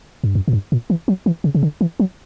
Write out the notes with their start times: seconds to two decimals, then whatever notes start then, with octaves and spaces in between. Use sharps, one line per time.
0.24 G2
0.35 F#2
0.48 A#2
0.53 G2
0.72 A#2
0.90 E3
1.08 F#3
1.26 E3
1.44 C#3
1.55 C#3
1.63 D3
1.81 E3
2.00 F#3